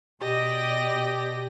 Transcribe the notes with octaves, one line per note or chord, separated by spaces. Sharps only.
B2 G4 D5 D#5 A#6